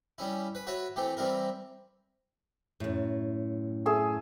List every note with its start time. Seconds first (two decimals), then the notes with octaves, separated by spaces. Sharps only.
0.18 G3 C#4 E4
0.55 B4
0.67 F#4 B4 C#5 E5
0.96 E3 A3 C4 G4
1.17 E3 G3 C4 E4 A#4
2.80 F#2 A2
3.86 A3 G#4 E6